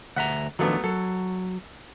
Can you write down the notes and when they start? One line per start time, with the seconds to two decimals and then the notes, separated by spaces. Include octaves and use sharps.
0.16 D2 E5 F#5 A#5
0.59 D#3 F3 F#3 A3 B3 D4
0.84 F#3 A4